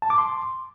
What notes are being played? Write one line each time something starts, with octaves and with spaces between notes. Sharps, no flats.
A5
D6
C6